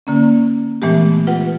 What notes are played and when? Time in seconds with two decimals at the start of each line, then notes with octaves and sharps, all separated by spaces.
0.07 D3 A#3 C#4
0.82 A#2 E3 G#3 A3 B3 G4
1.27 F4 B4 F#5